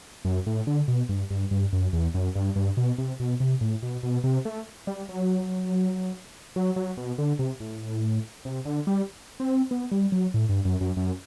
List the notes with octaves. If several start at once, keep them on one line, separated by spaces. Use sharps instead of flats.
F#2
A2
D3
B2
G2
G2
G2
F#2
E2
F#2
G2
G2
B2
C3
B2
C3
A2
B2
B2
C3
A3
G3
F#3
F#3
F#3
B2
D3
C3
A2
C3
D3
G3
C4
B3
G3
F#3
A2
G2
F#2
F#2
F#2